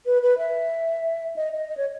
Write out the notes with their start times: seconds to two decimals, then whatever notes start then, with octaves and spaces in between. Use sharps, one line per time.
0.06 B4
0.22 B4
0.38 E5
1.36 D#5
1.53 D#5
1.69 D#5
1.77 C#5